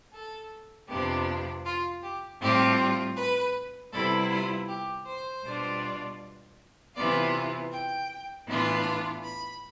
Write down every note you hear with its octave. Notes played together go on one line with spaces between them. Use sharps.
A4
F2 C3 F3 B3 D4 G4
F4
G4
A2 G3 C4 F4 G4
B4
C3 G3 B3 E4 A4
F4
G4
C5
B2 G3 D4 F4
C3 E3 B3 F4 D5
G5
A2 E3 B3 D4 F4
B5